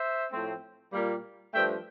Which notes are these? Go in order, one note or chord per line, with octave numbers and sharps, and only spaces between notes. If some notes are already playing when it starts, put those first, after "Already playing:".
Already playing: C5 E5
A2 F3 A3 C4
A#2 G3 A#3
G2 F3 A3 D4 E5 G5